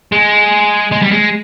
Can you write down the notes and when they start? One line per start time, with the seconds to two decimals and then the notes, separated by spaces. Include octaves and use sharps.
0.12 G#3
0.92 G#3
1.02 G3
1.11 G#3